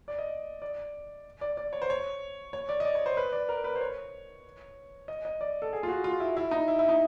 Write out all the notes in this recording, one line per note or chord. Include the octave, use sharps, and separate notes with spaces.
D5
D#5
D5
D5
D5
C#5
C5
C#5
C#5
D5
D#5
D5
C#5
C5
B4
D5
A#4
B4
C5
C#5
D#5
D#5
D5
A4
G#4
F4
F#4
F4
E4
E4
D#4
E4
E4
D#4